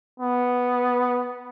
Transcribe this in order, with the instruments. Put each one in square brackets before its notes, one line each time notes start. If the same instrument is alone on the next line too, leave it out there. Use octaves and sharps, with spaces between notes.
[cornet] B3